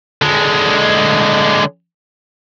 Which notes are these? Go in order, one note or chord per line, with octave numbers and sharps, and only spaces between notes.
D3 G#3